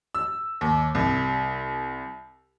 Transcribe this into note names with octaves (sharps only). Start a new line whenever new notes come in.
E6
D#2
C2